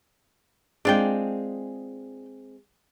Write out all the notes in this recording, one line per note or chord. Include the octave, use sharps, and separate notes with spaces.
G#3 C4 D4 F4 G#4 G5